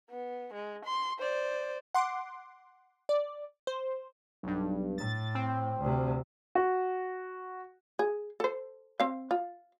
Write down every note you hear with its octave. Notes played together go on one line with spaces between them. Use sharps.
B3
G#3
C6
C5 D5
F#5 C6 D6
D5
C5
B1 G2
A2 A6
C4
D2 C3
F#4
G#4
A4 C5
C4 F5
F4